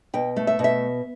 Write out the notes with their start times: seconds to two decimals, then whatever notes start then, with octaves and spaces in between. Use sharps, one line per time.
0.14 B2 G5
0.36 A3
0.47 E5
0.59 B2
0.64 E5